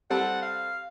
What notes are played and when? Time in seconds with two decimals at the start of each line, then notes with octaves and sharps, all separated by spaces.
0.10 G3 C4 A4 F#5
0.42 F5